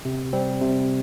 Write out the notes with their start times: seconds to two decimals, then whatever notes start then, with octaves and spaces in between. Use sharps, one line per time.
0.05 C3
0.33 G3 C4
0.61 C3